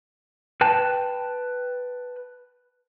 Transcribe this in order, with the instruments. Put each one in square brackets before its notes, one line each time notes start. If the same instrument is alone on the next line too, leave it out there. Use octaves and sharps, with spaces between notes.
[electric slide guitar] B4 G5 A5